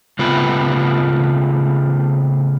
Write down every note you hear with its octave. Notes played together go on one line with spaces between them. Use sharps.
C#3 A3 B3 C4 F4 B4